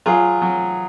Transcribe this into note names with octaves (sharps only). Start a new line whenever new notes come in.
F#3 F4 G#4
F#3